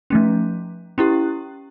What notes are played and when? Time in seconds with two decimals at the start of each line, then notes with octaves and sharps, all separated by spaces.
0.10 F3 A3 C#4
0.98 C#4 E4 G4